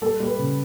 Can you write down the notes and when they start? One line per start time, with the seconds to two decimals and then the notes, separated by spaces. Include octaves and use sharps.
0.02 G3 A4
0.20 G3
0.27 B4
0.38 C#3